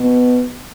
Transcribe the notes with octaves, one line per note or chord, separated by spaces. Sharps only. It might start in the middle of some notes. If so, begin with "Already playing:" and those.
Already playing: B2